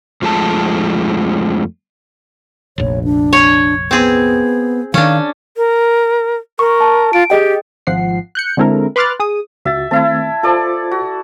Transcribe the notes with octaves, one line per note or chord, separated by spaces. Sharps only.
F2 F3 G#3 A3 A5
F1 A#1 C#5
D4
C#5
B3 C4 G#4
D#3 E3 C#4 D4 F5
A#4
A#4 C#6
A5
F4 D7
G4 G#4 D#5 G5
G#1 F3 F#5 C7
F#6 G6 C#7
D3 G#3 C4 E4 A4 A#4
B4 C6 D6 F6 F#6 A6
G#4 D#6
C#2 F#4 E5 A6
D#3 A3 C4 E4 E5 A5
F4 A4 C5 D5
F#4